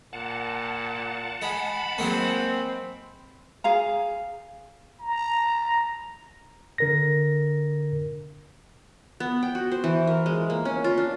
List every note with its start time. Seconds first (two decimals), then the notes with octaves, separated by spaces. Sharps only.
0.13 A#2 F#5 A5
1.42 G#3 B5
1.98 F#3 G#3 A#3 C4
3.64 G#4 F5 A#5
5.00 A#5
6.78 D3 A#4 A#6
9.20 B3
9.43 G5
9.55 F#4
9.72 C5
9.84 E3
10.07 A#4
10.26 G#3
10.50 A#3
10.65 C#4
10.84 F4
10.98 D4